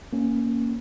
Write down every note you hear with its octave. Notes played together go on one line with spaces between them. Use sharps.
A#3 C#4